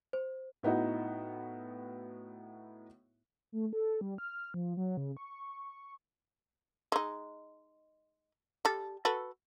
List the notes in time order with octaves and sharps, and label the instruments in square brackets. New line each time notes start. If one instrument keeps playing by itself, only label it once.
[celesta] C5
[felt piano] A2 B3 D#4 E4 F#4
[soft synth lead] A3
A4
G3
F6
F3
F#3
C#3
C#6
[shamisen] G#3 D#4
G3 A4
F#4 A4 B4